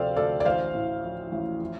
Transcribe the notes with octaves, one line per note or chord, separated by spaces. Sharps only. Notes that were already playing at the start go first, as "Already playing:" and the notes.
Already playing: D2 C3 F3 A4 C5 D5 F5 G5
D2 A4 D5
D5
A1 C5 F5
A2
F3
A1
F3